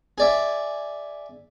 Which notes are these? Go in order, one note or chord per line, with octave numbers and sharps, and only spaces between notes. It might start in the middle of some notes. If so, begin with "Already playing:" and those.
G#4 D5 E5